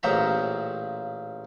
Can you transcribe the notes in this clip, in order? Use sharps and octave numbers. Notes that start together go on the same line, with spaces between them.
A1 A#2 C#3 C5 E5 A#5